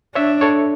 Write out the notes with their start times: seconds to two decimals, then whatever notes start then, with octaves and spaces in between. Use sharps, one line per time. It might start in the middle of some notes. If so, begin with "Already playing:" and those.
0.15 D4 C#5 E5
0.41 A4 C#5